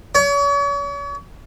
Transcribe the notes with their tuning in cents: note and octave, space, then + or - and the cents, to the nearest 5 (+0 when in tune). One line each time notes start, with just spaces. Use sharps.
C#5 +40